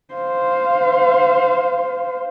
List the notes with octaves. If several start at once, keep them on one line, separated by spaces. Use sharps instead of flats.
C5 F5